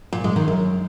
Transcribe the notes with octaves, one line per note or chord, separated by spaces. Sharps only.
A#2
G#3
D#3
F#2